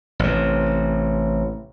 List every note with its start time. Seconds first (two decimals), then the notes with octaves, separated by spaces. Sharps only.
0.19 A1 C3